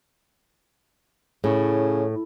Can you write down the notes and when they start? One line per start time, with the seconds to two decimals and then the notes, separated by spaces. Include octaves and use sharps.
1.44 A2 C#3